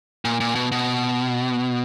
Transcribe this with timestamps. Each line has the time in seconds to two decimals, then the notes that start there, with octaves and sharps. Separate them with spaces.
0.25 A#2
0.40 A#2
0.55 B2
0.72 B2